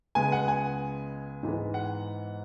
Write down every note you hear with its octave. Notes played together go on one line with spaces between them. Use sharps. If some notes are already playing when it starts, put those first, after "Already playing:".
C#2 C#3 G#3 B3 G#5
F#5
G#5
G#2 E3 G#3 B3
F#5